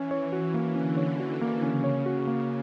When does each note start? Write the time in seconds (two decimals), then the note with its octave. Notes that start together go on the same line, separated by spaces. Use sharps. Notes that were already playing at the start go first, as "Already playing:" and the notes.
Already playing: E3 C#4
0.11 C#5
0.33 F#4
0.54 A#3
0.75 D3 C#4
0.97 C#5
1.20 F#4
1.41 A#3
1.63 C#3 C#4
1.84 C#5
2.06 F#4
2.27 A#3